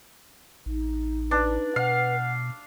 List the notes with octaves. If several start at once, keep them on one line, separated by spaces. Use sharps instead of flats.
A1 D#4
D4 B4
B2 F5 F#5